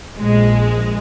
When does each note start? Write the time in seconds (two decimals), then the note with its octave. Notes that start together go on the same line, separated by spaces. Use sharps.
0.19 A#1 G#3